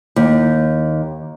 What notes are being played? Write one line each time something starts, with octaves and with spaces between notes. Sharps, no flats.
D#2